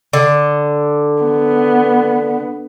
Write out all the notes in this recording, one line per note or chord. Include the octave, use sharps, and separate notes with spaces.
D3
B3